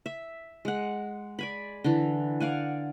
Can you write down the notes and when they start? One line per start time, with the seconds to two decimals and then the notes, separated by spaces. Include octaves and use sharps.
0.06 E5
0.65 G#3 F#5
1.39 D5 G#5 B5
1.84 D3 E3
2.40 D5 F5 F#5 G#5